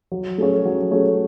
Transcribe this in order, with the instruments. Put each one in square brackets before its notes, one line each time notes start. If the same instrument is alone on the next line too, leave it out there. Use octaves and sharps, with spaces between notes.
[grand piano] F#3
A3 C#4 G#4 C#5
F#3
A3 C#4 G#4 C#5